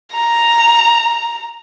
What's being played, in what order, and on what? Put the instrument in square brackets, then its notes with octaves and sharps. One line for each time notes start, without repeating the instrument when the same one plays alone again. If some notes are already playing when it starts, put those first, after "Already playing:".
[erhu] A#5